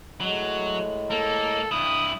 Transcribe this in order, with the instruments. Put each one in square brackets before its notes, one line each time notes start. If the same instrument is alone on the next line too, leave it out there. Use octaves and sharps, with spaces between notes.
[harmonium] A2 G#3 [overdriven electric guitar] F#3
[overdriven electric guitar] A#3 [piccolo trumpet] A4
[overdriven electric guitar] G2 E4 [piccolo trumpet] D#6